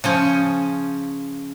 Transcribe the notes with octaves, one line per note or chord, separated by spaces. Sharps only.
C#3 F3 C#4